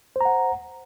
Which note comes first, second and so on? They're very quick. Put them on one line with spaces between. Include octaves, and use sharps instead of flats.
C5 A#5 F#5